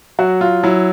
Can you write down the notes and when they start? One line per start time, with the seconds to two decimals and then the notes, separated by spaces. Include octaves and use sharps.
0.19 F#3 F#4
0.41 F4
0.63 F#3 E4